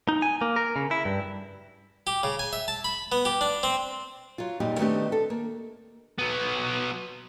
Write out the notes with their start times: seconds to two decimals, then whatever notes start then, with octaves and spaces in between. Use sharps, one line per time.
0.09 D#4
0.22 G#5
0.41 A#3
0.56 A#4
0.76 C#3
0.91 E4
1.05 G2
2.07 G4
2.23 C#3
2.39 G#5
2.53 E5
2.68 A5
2.84 B5
3.12 B3
3.25 G4
3.41 D4
3.63 C4
4.38 F#3 F4
4.60 F#2 A#2 G3 D#4 G4
4.79 D#3 A3 B3 C4 D4 G4
5.12 A4
5.30 A#3
6.18 F#3 B3